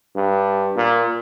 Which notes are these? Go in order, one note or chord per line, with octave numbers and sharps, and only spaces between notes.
G2
A#2